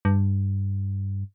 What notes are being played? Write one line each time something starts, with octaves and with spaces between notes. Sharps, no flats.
G2